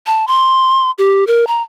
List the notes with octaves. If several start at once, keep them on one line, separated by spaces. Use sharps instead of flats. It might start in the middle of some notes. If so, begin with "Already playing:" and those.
A5
C6
G4
A#4
A#5